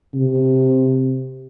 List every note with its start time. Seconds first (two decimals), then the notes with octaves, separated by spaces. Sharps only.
0.14 C3